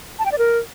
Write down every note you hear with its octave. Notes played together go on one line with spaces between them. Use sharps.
A5
G5
D5
A#4